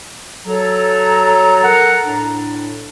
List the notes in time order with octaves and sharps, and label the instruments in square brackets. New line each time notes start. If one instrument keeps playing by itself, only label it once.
[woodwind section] F#3 [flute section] A4 A#5
[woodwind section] A#4 F#5
A2 D4